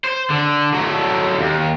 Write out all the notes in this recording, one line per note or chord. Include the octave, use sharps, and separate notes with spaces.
C5
D3
F#3 A3
D#2